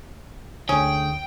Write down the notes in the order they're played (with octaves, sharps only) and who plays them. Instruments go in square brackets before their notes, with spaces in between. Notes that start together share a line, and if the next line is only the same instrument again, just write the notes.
[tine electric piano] D2 D3 [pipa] C#4 G#4 [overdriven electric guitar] G5